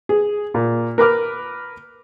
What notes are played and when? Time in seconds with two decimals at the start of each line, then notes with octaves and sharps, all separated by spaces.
0.09 G#4
0.54 A#2
0.98 A#4 B4 D6 F6